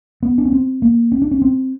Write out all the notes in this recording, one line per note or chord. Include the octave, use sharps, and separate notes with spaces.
B3
D4
C#4
C4
A#3
C#4
D4
C#4
C4